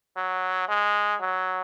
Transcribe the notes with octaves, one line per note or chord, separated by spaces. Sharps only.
F#3
G#3
F#3